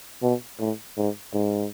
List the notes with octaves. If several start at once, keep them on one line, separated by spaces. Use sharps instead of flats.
B2
A2
G#2
G#2